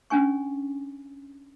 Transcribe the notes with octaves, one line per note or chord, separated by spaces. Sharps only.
C#4 D4 G#5 C#6